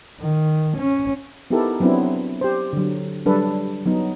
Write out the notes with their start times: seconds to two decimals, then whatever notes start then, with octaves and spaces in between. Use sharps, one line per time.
0.21 D#3
0.78 C#4
1.50 B3 D#4 E4 G4 A4 A#4
1.80 F#3 B3 C4 D4 E4
2.41 G4 C5
2.73 D3 F#3
3.26 F#3 G3 D4 A4 B4
3.86 F#3 B3 D#4